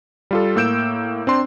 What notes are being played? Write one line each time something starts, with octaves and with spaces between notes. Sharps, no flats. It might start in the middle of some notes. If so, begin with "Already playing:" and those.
G3 F4 A4
A2 A#3 E6 G6 D7 E7
C4 D4 C6